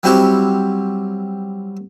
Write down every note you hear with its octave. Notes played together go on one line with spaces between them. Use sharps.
F#3 G3 C4 E4 F#4 G4